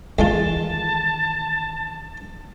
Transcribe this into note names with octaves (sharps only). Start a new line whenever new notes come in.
E2 D#3 E3 G#3 F4 A5